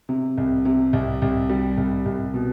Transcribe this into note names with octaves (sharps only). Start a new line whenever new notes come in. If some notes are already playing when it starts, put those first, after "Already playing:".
C3
C2
C3
C2
C2
G3
C2
C2
B2